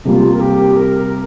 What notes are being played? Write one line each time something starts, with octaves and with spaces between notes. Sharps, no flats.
C3 G3 A#3 F4
A#4
G4
A#4